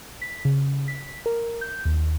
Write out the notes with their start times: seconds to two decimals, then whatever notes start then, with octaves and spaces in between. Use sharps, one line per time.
0.22 B6
0.45 C#3
0.88 B6
1.26 A#4
1.61 G6
1.85 D#2